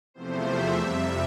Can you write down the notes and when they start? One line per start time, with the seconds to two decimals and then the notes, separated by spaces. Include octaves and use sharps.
0.14 E2 C3 F3 A3 C5
0.44 E5
0.75 F2 C3 G3